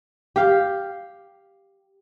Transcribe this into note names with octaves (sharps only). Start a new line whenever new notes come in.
G4 F5